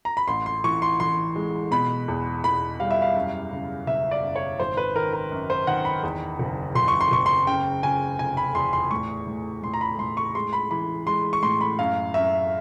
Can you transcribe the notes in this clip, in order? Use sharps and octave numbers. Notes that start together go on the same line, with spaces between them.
A#5
B5
A1 C6
C6
E3 C#6
C6
E3 C6
G#3
B2 B5
E2
E2 B5
G3 F5
E5
F5
F#2
C#3
F#1 E5
D5
F#2
C#5
G#1 C5
B4
D#3 A#4
A#4
F#2
C5
D#3 F#5
B5
E2
F#1
F#1 C6
C#6
C6
F#1 C#6
C6
C#3 G5
C#3 G#5
F1 G#5
B5
E2 C6
C6
A2 C#6
A2
A2 C6
A#5
B5
A2 C6
C#6
G#3 C6
B5
E3 B5
G#3 C6
C#6
A2 C6
B5
F#2 F5
F#2 E5